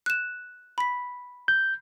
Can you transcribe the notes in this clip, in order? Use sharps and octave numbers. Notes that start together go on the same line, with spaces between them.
F#6 E7
B5 B6
G6